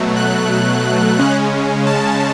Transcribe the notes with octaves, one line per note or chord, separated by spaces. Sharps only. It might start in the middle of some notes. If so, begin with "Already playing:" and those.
Already playing: B2 F#3 A3
F#6
C#3 G#3 C#4
A5